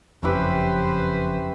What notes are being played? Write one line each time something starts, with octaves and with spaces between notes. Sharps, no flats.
F#1 F2 C#4 E4 G4 B4 C5